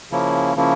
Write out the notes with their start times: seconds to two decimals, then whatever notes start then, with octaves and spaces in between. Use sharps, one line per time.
0.11 C#3 F3 A#3 C#4 E4
0.56 C#3 F3 A#3 C#4 E4